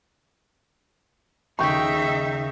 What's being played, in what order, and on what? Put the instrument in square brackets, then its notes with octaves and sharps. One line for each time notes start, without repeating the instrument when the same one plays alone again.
[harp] D#2 C#3 [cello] D#4 E5 [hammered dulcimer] G5 C#6